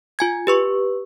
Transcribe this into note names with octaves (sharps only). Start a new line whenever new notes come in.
F4 G#5 G#6
G4 B4 C#6